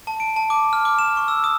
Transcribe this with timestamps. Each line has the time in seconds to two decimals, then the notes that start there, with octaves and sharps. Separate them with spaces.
0.07 A5
0.20 D7
0.36 A5
0.50 D6
0.73 F6
0.85 D6
0.99 E7
1.17 C#6
1.28 E6
1.44 D#6